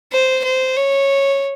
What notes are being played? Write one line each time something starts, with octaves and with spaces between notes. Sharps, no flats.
C5
C5
C#5